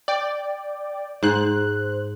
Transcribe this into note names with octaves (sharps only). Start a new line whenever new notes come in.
D5 G5
G#2 C5 F#6